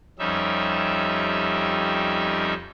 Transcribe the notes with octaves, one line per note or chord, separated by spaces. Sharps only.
F2 G3 C#4 D#4 E5